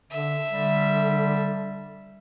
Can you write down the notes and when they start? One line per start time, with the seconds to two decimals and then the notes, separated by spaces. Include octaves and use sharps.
0.11 D3 E5
0.50 D3 G3